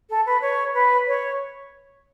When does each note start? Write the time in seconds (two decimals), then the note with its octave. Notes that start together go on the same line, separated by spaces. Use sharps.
0.10 A4
0.26 B4
0.41 C#5
0.74 B4
1.07 C#5